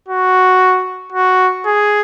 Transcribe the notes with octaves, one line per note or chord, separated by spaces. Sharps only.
F#4
F#4
G#4